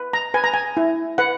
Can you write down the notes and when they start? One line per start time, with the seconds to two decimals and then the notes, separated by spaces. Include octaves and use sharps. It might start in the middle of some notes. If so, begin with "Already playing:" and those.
Already playing: B4
0.13 A#5
0.34 B4 G#5
0.44 A#5
0.54 G#5
0.77 E4
1.18 B4 F#5